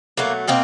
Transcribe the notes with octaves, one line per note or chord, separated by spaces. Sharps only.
B2 F#3 A3 A#3
B2 A#3 C4